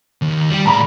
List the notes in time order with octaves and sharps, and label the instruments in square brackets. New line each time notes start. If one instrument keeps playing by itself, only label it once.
[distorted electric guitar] D#2
G3 G4
[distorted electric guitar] A2 D5 [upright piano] A#5 B5